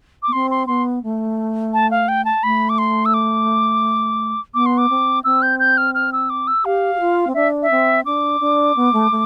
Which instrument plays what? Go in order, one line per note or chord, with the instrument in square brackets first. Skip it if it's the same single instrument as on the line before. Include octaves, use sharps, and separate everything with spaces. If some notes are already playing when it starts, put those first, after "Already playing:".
[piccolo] D6
[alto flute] B3
[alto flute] C4 [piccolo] C6
[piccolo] C6
[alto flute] B3 [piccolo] C6
[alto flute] A3
[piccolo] A5
F5
G5
A5
[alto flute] A3 [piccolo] B5
[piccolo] D6
C6
E6
D6
[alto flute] B3 [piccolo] D6
[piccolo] C6
D6
[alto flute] C4
[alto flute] C4 [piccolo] E6
[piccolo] G6
G6
F6
F6
E6
D6
E6
[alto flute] G4 [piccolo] F5
[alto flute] G4
F4
C4
[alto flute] D4 [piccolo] E5
[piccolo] E5
[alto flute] C4
[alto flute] D4 [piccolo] D6
[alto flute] D4
B3
A3
A3